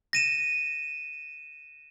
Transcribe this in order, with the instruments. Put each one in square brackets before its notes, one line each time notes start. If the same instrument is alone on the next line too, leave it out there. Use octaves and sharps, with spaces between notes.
[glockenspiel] A#6 D#7 E7